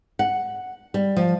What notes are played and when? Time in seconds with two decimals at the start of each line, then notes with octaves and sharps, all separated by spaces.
0.19 F#5
0.94 G3
1.16 F3